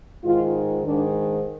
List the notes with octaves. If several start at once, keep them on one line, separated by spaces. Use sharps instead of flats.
G#2 D#3 F4
G#2 D#3 D4